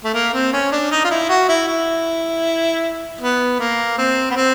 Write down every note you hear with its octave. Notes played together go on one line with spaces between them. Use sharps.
A3
A#3
C4
C#4
D4
D#4
F4
E4
F#4
E4
E4
B3
A#3
C4
B3
C4